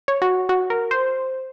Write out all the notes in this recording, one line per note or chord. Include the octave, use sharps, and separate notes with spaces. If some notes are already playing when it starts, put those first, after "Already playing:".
C#5
F#4
F#4
A#4
C5